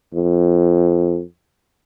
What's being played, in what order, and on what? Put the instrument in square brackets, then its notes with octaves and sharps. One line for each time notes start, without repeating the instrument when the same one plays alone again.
[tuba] F2